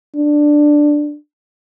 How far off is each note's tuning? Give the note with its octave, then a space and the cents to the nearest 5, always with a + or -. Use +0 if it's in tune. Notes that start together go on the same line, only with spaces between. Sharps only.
D4 +5